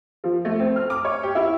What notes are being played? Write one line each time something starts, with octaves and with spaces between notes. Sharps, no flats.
F3
A3
C4
F6
D6
C#5
G4
E4